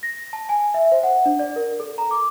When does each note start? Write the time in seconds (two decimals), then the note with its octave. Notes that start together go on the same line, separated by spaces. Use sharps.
0.03 A#6
0.33 A5
0.49 G#5
0.74 E5
0.92 C5
1.03 F#5
1.26 D4
1.39 D5
1.56 A#4
1.80 A4
1.98 A#5
2.11 D6